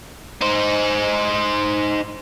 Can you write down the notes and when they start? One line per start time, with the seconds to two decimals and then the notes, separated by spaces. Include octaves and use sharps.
0.42 D#4 C5